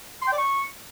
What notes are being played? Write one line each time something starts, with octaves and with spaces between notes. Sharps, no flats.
C6
G5
D5
C#6